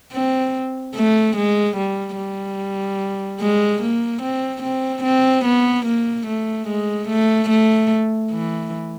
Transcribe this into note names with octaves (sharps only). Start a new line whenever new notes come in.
C4
A3
G#3
G3
G3
G#3
A#3
C4
C4
C4
B3
A#3
A3
G#3
A3
A3
E3